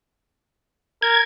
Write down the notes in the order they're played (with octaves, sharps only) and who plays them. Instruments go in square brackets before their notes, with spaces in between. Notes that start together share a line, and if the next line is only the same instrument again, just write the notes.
[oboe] A#4 [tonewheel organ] G#6